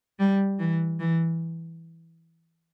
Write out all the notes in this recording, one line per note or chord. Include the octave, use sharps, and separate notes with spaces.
G3
E3
E3